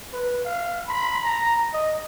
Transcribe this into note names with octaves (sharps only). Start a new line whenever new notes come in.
B4
F5
B5
A#5
D#5